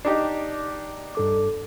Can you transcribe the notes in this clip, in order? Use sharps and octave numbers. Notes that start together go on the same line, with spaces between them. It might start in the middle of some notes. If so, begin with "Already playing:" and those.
D4 D#4 G4
G2 A4 D6